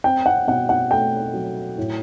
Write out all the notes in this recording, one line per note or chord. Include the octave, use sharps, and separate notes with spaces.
C4 G5
F#5
B2 F#5
F#5
A3 G5
F#3
A2